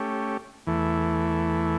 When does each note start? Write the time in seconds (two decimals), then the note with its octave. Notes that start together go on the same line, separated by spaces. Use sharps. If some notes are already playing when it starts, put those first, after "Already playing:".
Already playing: A3 C#4 G4
0.67 E2 E3 A3